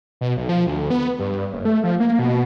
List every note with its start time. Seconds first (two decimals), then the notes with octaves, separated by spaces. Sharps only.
0.21 B2
0.37 B1
0.49 F3
0.67 D2
0.90 B3
1.19 G2
1.52 F#1
1.65 A3
1.84 F3
2.00 A#3
2.19 B2